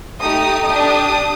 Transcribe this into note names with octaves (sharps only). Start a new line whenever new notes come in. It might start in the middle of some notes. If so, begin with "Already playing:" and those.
A3 D#4 G4 D#6
D4 G4 D#6